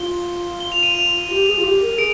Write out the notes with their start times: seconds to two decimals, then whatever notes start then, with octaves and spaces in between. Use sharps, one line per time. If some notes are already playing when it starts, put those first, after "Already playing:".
Already playing: F4 G7
0.60 G7
0.72 F7
0.83 D#7
0.95 F7
1.29 G4
1.47 G#4
1.57 F4
1.63 G4
1.82 A#4
1.98 G#4 D7